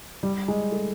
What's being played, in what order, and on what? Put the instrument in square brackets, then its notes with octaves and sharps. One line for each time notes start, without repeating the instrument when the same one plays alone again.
[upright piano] G3
G#3
A3